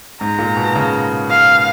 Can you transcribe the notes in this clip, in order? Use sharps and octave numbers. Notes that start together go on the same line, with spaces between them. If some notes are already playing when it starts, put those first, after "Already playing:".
G#2 A#5
A#2
B2
C#3
F5